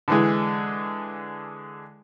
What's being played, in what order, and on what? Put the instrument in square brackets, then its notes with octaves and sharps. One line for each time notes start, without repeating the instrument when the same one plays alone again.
[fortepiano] D3 E3 G#3